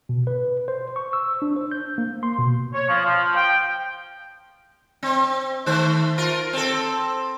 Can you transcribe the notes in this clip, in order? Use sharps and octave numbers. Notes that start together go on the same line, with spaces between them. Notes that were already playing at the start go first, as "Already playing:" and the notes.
B2
B4
C5
C#6
E6
D4
C5
G6
A#3
C6
B2
C#5
F3
F3
G5
C4
D#3 A3 C5
F4 A#4
C4 A4